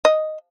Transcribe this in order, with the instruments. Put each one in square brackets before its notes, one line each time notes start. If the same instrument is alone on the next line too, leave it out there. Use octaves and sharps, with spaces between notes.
[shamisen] D#5